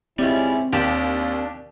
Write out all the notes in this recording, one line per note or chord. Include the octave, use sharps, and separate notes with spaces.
C#2 G3 C4 C#4 E4
D#2 D4 G4 A5 B5